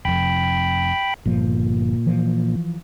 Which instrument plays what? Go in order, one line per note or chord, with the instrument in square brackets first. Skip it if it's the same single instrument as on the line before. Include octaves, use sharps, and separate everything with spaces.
[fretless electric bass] F1 F2 [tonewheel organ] G5 B5
[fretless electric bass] G1 F3 [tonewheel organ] A#2
[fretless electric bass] E3 F3